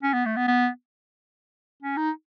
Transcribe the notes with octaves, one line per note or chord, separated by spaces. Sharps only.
C#4
B3
A3
B3
B3
C#4
D#4